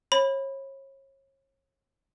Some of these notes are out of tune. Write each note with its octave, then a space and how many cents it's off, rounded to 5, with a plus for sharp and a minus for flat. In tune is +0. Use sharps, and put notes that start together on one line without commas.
C#5 -35 B5 +0